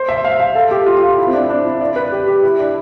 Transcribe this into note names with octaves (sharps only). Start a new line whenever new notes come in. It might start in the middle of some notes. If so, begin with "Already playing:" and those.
Already playing: C5
E5
F5
F5
A4
G4
F4
F4
E4
C4
D4
D4
E4
D5
B4
G4
G4
E4
D4